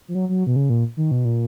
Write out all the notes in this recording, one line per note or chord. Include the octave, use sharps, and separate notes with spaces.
F3
F#3
F#3
B2
C#3
A#2
D#3
B2
A#2